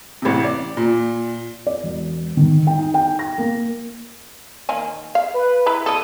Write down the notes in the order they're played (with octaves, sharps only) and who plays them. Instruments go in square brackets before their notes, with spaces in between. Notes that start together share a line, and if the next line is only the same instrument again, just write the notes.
[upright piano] A1 C3
D5
A#2
[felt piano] D5
E1
D#3
G5
D#4
G5
A#6
A#3
[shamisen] D#3 A#3 G#5
F5
[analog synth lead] B4
[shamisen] E4 B4 A#5
[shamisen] C#3 A4 [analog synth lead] D#6